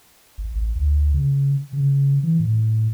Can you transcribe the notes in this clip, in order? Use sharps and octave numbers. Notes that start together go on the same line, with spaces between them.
G#1
A1
D2
C#3
C#3
E3
A2